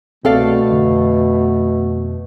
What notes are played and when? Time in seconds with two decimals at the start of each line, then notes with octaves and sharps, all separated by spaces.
0.25 C2 B2 A3 C4 A4 D5 F5
0.71 F2 D3